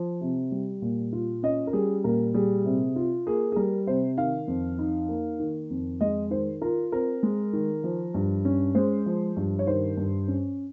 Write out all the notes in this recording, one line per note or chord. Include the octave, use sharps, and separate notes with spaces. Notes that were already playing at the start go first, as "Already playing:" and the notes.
Already playing: F3
C3
G3
A#2
F4
C#4 D#5
A#4
G3 G#4
A#2 A#4
G3 G#4
C3
F4
A#3 G#4
G#4
G3 A#4
C3 C5
D#3 F5
F2
D#4
A#3
D#3
F2
G#3 D#5
D#3 C5
F4 A#4
C4 A#4
G#3
D#3
F3
G2
C#4
G#3 C5
F3
G2
C#5
D#3 C5
G2
C#4